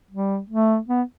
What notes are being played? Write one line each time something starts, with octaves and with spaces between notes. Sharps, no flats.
G3
A3
B3